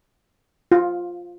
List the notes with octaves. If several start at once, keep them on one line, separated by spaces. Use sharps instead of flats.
F4